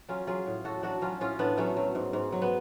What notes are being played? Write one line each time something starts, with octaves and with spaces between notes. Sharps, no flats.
F#3 C#4 F4
F#3 F4 G#4
A2
A2 F#4 A4
F#3 D4 F#4
F#3 C#4 F4
A2 C#4 F4
A2 B3 D4
F#3 A3 C#4
F#3
G#2
G#2
F#3
B3